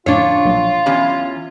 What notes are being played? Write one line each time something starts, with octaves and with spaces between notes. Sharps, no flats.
F2 A2 D3 D4 F4 C#5
A#1 B2 F#3
E2 C#4 G4 B5